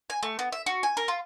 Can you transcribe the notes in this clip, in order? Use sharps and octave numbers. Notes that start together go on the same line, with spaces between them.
G#5
A3
B3
E5
F#4
G#5
A#4
F4